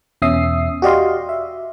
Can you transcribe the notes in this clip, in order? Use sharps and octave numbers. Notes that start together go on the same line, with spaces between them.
E2 B2 C#4 E5 D#6 C7
F#4 G4 D5 D#5 F5 C6
E5